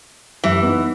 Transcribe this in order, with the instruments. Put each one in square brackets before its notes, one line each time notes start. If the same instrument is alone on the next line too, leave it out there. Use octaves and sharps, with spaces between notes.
[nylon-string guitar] F#2 G4 E5 [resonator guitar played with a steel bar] E3
[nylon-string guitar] B3 C#4 D#4